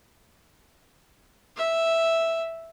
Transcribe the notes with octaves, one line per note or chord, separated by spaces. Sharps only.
E5